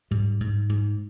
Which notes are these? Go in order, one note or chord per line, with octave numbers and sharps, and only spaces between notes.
G#2 G3
G#2
G#2